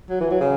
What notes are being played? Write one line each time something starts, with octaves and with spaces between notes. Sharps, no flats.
F#3
E3
F#3
C#3